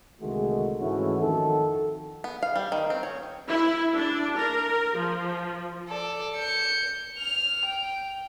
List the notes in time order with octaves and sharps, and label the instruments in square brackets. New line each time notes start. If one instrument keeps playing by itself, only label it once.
[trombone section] C2 D3 D#3 G#3 A3 F#4
G#2 E3 A3 C#4 E4 F#4
F2 D#3 F#4 A4
[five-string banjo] B3
F5
G3
D#3
C4
C#5
[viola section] E4
D4
A#4
F3
[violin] A4 D5
G6 C#7
F6 F7
G5